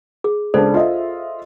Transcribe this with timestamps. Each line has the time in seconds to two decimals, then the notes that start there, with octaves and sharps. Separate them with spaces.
0.24 G#4
0.54 C#2 D4 A4 C5 D5
0.74 F4 D#5 E5